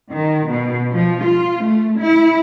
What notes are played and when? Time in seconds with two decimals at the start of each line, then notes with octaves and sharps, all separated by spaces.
0.11 D#3
0.47 B2
0.93 F3
1.22 F4
1.62 A3
1.99 E4